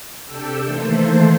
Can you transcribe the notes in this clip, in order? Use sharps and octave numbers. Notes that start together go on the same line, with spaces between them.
C3 D4 G4 A4 G5 E6
D#3 E3 A3 A#3 A4 C5